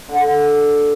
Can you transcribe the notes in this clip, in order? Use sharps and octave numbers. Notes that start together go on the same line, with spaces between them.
D3